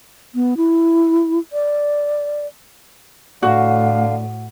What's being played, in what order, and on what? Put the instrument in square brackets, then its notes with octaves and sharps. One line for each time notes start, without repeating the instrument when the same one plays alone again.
[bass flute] B3
E4
D5
[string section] A2 [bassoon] D3 [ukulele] F#4 [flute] F5